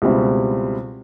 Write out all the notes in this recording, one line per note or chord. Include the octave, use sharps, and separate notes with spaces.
C#2 B2 G3 C4 E4